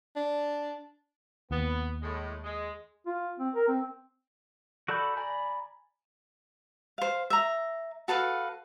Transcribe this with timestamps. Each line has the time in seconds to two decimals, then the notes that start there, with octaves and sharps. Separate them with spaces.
0.16 D4
1.51 D#2 B3
2.03 A2 G#3
2.44 G#3
3.06 F4
3.39 C4
3.55 A#4
3.68 C4
4.88 F#4 A4 D5 B5 G6
5.17 D5 G#5 A#5 B5
6.98 C5 F5
7.30 E5 A#5
8.08 F#4 A4 B4 F5